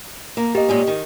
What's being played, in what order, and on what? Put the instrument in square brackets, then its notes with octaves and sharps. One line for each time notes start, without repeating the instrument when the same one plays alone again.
[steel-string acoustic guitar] A#3
[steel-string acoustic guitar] A#3 [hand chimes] G4 D#5
[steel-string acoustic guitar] A#2 G#3 C#4
D#3